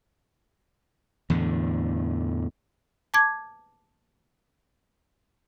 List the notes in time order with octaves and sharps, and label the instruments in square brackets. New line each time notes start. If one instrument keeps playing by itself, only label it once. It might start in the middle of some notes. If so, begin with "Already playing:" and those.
[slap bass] E2 A2 D3
[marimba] A5 D6 G#6